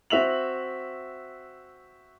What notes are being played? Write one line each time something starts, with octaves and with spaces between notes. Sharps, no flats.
C4 F#4 E5 F7 F#7